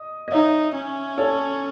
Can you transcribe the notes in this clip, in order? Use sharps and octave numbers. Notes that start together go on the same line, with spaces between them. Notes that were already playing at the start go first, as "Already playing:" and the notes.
Already playing: D#5
D#5
D#4 C#5 E5
C#4
A4 C#5